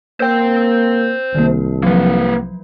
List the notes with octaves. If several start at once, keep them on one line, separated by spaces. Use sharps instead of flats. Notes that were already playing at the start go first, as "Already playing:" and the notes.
A#3 C5 G5 E6 G6
C2 D#3 A#3
F3 F#3 A#3 B4